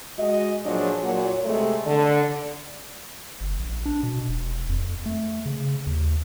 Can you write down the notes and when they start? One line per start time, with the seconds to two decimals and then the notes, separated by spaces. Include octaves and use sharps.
0.18 G#3 F#4 D#5
0.65 A#2 F3 F#3 D4 G#4
1.03 A#2 F#3
1.45 C3 G#3 A3
1.86 D3
3.41 G1
3.59 A#1
3.86 D4
4.03 B2
4.28 E1
4.69 F2
5.06 A3
5.46 C#3
5.87 D#2